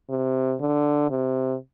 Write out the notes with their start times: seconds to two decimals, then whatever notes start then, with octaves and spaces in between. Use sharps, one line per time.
0.09 C3
0.60 D3
1.10 C3